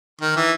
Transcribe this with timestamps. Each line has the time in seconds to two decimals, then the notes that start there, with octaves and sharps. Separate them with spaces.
0.21 D#3
0.36 E3